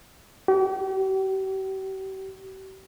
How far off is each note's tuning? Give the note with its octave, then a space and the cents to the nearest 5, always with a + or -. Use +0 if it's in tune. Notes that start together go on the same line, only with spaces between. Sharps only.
G4 -40